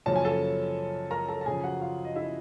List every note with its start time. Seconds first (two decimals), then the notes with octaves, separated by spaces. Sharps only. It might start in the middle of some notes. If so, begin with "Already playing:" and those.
0.06 F#2 C#3 F3 A#3 C#4 A5
0.16 G#5
0.25 A4 A5
1.11 A#4 A#5
1.29 A4 A5
1.41 A5
1.46 F#2 C#3 F3 G#4 G#5
1.64 F#4 F#5
1.81 F4 F5
2.05 D#5
2.16 E4 E5